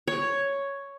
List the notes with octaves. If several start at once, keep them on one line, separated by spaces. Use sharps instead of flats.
C#5